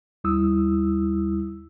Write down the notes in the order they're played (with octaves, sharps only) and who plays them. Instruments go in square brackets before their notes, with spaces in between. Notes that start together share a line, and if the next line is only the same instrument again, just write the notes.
[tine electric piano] D#2 G3 E4 D#6 E6